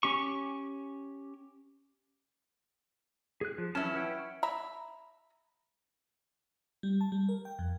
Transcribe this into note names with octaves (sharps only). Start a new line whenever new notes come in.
C#4 G4 C#6
G#4 F#6
F3
E3 F#3 C#4 E4 A5
B4 F#5 G5
E5 A#5 B5
G3
A5
G3
A#4
G5
F2